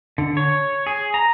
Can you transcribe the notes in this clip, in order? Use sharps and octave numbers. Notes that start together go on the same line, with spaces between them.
D3
C#5
G#4
A#5